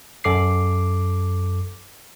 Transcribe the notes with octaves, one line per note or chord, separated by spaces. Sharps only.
F#2 A4 D6 C7